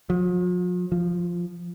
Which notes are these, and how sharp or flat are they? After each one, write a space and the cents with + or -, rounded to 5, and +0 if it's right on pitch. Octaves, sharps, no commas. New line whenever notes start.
F3 +45
F3 +0